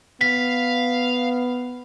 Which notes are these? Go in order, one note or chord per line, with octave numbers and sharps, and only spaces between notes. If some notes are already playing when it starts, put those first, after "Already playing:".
B3 F5 B6